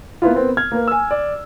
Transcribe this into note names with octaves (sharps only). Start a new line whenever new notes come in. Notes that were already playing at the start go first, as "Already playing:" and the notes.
A#3 B3 E4 F4
B3 C4 A#4
F6 G#6
A#3 B4
G#5 E6
D5